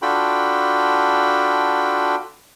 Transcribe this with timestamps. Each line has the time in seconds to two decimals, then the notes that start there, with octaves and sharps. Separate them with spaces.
0.02 D4 F4 F#4 A4 G5 B5